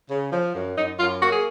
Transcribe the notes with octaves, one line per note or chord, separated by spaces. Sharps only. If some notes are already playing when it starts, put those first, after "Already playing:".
C#3
F3
F#2
F#2 D#4
F#2 F4
A#3 F#4
G#4